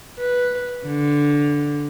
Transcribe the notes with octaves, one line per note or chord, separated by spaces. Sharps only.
B4
D3